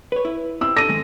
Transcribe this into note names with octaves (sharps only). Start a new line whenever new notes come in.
B4 C#5
E4
C4 E4 E6
D4 A4 A#6 D#7
D#3 G#3 C4